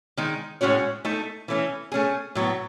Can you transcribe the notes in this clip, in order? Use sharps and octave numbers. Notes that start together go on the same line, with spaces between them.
D#3 G#3 D#4
A2 G#3 C#4 F#4 C#5
A3 D#4 A4
E3 A3 C#4
A3 C#4 G#4
A2 F#3 B3